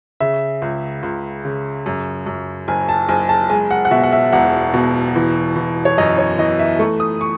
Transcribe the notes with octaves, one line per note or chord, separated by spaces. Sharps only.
C#3 E5
C#2
C#2
C#3
F#2
F#2
F#1 G#5
A5
F#1 G#5
A5
G#3 G#5
F#5
F#5
B2 E5
F#5
E5
E1 F#5
B2
E3
E3
C#5
F#2 D#5
C#5
E3 D#5
E5
A3 C#6
D#6
C#6